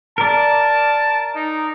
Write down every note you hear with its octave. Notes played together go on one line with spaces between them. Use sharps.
A#4 D5 A5
D#4